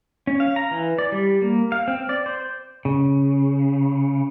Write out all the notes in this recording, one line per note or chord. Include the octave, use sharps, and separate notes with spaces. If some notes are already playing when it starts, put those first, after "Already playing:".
C#4
F5
A#5
E3
D5
G3
A#3
F5
C4
D5
C5
C#3